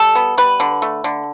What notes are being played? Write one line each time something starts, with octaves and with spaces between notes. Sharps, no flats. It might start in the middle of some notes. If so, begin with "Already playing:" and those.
Already playing: G3 A4
B3
G3 B4
D3
A3
D3